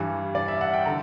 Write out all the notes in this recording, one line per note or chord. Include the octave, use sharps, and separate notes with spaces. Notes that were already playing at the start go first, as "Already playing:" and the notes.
Already playing: G2 E3 G3
D5
E5
F#5
G5
D3 A#5